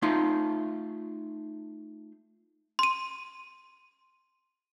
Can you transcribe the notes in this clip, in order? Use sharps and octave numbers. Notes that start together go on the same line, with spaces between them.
A3 D#4 F4 C6
C6 D#7